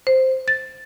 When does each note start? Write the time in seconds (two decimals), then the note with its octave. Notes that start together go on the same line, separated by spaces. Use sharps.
0.07 C5
0.48 A6